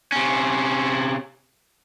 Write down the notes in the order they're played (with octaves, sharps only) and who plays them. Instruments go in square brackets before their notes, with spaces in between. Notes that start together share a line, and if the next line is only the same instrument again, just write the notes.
[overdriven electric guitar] C3 C#4